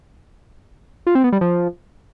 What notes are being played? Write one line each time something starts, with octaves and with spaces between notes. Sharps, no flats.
F4
C4
B3
G3
F3